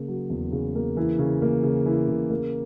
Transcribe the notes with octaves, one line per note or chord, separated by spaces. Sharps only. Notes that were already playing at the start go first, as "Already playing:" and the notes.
Already playing: C#3 A#3
F#3
E2
C#3
A#3
E3
C#3
A#3
C#3
E3
C#3
A#3